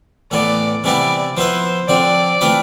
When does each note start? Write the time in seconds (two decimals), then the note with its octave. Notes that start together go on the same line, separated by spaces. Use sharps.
0.31 A2 E3 B3 D5
0.83 C3 E3 G3 B3 E4 D5
1.36 F3 B3 E4 B4 C5
1.88 D3 F3 C4 D5
2.41 E3 A3 C4 F4 B4